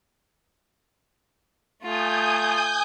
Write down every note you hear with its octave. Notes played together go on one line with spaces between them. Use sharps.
A3 F4 G#5 D#6 G6